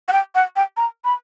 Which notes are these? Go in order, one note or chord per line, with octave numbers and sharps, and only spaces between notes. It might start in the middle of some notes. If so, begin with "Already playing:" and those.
F#5
G5
F#5
G5
A#5
B5